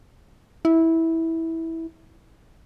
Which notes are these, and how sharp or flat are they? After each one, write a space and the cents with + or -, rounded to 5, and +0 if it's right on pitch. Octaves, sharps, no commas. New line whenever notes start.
E4 -15